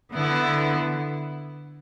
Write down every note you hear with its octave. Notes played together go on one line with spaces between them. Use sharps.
D3 B3 E4